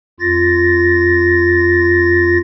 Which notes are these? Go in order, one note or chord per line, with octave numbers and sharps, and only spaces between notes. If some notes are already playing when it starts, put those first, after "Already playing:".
F2 F4 A6 A#6